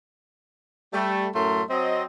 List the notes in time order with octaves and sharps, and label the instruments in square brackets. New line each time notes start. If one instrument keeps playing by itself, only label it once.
[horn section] G3 A3
F#2 A2 F#3 A3 A#4 C6
F#3 C4 D#5